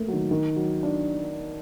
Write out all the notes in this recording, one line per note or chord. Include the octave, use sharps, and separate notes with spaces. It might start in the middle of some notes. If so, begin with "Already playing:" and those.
Already playing: A3 A#3
F#3
D#3
D#3
F#3
D4